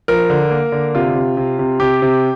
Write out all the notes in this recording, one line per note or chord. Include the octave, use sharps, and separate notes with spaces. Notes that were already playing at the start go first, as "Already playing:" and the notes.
F3 A#4
D3
A#3
D3
C3 F4
C3
C3
C3
C3 G4
C3